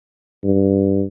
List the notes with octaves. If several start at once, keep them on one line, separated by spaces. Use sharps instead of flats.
G2